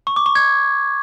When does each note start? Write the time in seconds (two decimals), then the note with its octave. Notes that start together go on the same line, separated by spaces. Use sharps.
0.07 C#6
0.16 D6
0.26 C#6
0.35 G#6